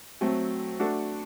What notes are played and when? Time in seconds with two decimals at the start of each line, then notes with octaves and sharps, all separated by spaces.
0.21 F#3 A3 C4
0.80 A3 D4 F#4 A4